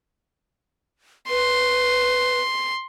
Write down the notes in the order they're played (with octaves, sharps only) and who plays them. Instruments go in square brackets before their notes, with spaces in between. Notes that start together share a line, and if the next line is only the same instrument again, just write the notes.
[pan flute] B4 [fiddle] C6